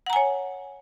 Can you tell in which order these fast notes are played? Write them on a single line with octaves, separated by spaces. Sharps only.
F#5 A#5 G#5 C#5